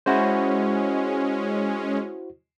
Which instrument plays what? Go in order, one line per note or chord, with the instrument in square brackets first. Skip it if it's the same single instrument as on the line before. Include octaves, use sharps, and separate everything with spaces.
[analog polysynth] G#3 C#4 [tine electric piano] E4 F#4 C5